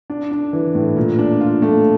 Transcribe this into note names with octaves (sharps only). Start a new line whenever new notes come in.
D4
D4
E3
A2
A#2
D4
F4
A3